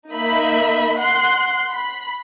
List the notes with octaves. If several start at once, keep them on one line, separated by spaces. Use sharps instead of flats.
A#3 D#4 D#5 E5 B5
F#5 C6 F#6
B5